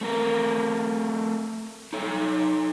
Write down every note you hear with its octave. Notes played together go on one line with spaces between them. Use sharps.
A3 C4 A#4
D#4 A4 C#5